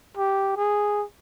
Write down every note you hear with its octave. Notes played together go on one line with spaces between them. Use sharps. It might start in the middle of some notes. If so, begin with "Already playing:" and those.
G4
G#4